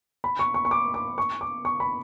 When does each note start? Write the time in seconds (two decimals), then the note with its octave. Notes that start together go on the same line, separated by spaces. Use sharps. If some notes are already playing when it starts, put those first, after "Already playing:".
0.24 B5
0.39 C#6
0.54 C#6
0.65 C#6
0.71 D6
0.94 D6
1.18 C#6
1.41 D6
1.65 C#6
1.80 B5